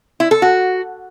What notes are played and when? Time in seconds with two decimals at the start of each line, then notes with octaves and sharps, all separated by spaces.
0.20 E4
0.31 A4
0.42 F#4